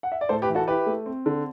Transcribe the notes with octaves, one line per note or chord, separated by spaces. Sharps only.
F#5
E5
D5
A2 A4 C5
G4 B4
E3
F#4 A4
E4 G4 B4
A3
C4
D3